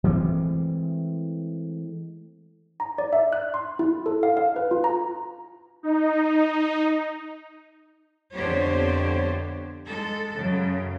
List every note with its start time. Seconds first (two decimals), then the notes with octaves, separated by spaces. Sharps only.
0.04 E3 G#3 A3 C4
2.80 A#5
2.98 D5
3.13 E5
3.33 F#6
3.54 C6
3.79 E4
4.06 A4
4.23 F5
4.37 F5
4.56 B4
4.71 F4
4.84 A#5
5.83 D#4
8.33 F2 D3 B3 G4 C5 C#5
9.86 G#3 A4
10.36 F#2 C#3